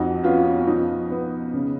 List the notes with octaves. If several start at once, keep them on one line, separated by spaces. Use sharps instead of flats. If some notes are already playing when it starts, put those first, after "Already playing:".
Already playing: F2 D#4 F#4
B3 C#4 F4
C#4
F3 D#4
B3
C#3